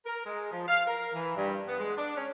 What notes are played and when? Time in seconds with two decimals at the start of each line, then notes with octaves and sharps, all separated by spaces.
0.06 A#4
0.26 G#3
0.52 F3
0.68 F5
0.87 A#4
1.14 E3
1.37 G2
1.67 B3
1.79 G#3
1.97 D4
2.17 C#4